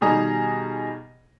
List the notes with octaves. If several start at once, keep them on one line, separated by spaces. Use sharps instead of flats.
B2 D#3 G3 G#4 D#5 A#5